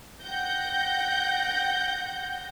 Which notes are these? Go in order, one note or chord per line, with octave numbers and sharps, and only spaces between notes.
F#5 G5 G6 A#6